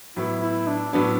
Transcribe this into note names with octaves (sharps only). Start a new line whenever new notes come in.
A2 F#3 B3 E4
E4
D4
A2 F#3 B3 D4